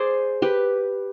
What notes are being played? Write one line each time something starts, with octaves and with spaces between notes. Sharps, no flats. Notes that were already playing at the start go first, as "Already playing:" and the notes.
Already playing: G#4 C5 D5
G4 B4